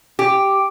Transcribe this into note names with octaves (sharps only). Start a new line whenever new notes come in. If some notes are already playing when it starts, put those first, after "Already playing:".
G4